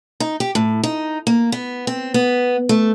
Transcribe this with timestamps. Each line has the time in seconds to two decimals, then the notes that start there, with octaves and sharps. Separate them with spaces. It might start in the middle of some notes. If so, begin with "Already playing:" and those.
0.20 D#4
0.40 G4
0.55 A2
0.83 D#4
1.27 A#3
1.52 B3
1.87 C4
2.14 B3
2.69 A3